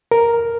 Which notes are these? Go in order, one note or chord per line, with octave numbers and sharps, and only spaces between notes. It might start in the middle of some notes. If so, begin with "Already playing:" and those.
A#4